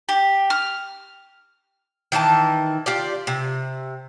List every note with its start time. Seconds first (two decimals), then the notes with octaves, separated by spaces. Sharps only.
0.09 G4
0.50 F6
2.12 D#3 E3 C5 A5
2.86 F4 G4 D5
3.27 C3